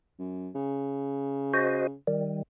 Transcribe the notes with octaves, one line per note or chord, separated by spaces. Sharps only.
F#2
C#3
F#4 C5 D#5
D#3 G3